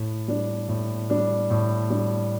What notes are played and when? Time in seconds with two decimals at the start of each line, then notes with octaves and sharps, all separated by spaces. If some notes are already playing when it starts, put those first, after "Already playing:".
Already playing: A2
0.28 G3 D4
0.69 A2
1.10 G3 D4
1.50 A2
1.90 G3 D4